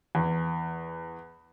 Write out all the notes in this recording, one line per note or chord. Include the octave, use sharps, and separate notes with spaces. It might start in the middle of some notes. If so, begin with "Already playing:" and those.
E2